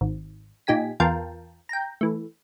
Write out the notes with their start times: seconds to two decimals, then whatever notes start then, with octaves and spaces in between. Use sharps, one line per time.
0.01 G#1
0.67 A#2 D#4 G4 G#5 B6
1.00 E2 F4 A#4 G5 A5
1.69 G5 A#5
2.01 E3 A3